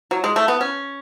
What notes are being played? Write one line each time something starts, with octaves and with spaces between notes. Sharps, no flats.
F#3
G#3
A3
B3
C#4